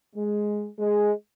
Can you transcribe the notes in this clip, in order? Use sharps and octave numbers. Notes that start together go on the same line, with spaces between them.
G#3
G#3